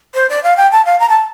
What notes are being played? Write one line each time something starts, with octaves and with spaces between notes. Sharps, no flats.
C5
D5
F5
G5
A5
F5
A#5
A5